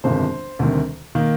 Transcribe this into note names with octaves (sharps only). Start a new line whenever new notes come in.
G1 F2 C3 D#3 G#3 C5
D2 C3 D#3 G3
D#3 A#3